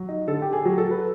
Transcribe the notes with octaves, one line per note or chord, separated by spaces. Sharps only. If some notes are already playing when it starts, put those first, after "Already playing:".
Already playing: F#3
D#4
D3 A4
G4
G#4
F#3
A4
B4